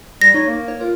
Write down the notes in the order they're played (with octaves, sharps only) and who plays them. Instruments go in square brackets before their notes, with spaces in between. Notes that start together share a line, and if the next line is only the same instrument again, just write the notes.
[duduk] G3 [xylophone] A#6
[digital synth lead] D#4 [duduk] C#5
[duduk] A#3
[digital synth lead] C#5
[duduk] F4 [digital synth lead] A#4